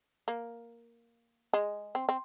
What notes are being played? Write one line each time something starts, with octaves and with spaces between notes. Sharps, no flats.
A#3
G#3
C4
C4